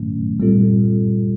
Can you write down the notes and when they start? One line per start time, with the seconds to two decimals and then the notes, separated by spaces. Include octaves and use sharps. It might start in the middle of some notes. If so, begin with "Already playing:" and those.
Already playing: G#2 D#3 F#3 A3 C#4
0.40 A#2 G3 C4 F4 A4